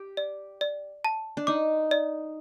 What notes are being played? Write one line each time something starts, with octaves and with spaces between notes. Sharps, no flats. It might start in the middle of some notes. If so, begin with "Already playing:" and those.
Already playing: G4
D5
D5
A5
D4
D#4 D6
D5